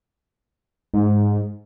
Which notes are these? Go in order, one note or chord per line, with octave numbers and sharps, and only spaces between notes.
G#2